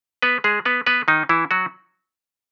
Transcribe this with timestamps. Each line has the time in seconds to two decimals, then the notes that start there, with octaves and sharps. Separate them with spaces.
0.22 B3 B4
0.44 G#3 G#4
0.65 B3 B4
0.86 B3 B4
1.08 D#3 D#4
1.29 E3 E4
1.51 F#3 F#4